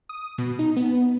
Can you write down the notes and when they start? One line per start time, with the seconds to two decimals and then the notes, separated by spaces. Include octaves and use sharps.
0.09 D#6
0.38 B2
0.59 D#4
0.76 B3